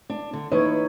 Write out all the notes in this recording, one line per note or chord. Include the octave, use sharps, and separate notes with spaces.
D4
D3
E3 A#3 D#4 B4 C#5 D#5